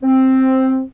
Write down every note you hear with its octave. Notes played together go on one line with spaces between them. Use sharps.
C4